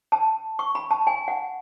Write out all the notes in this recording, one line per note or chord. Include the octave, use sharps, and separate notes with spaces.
A5
C#6
B5
A5
G#5
F#5